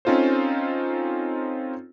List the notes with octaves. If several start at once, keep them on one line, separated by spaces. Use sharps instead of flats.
C4 C#4 D#4 F4 A4 C5